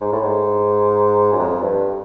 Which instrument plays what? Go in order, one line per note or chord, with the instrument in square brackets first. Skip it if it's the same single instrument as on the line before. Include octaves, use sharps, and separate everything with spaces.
[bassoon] G#2
A2
G#2
F#2
F2
G2